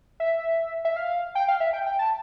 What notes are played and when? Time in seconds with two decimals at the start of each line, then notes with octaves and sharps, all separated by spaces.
0.20 E5
0.85 E5
0.96 F5
1.35 G5
1.48 F5
1.60 E5
1.73 G5
1.86 G5
1.99 A5